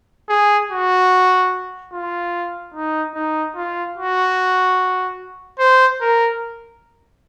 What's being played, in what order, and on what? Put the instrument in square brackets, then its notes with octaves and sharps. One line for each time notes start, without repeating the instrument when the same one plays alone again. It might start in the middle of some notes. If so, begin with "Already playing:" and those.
[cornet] G#4
F#4
F4
D#4
D#4
F4
F#4
C5
A#4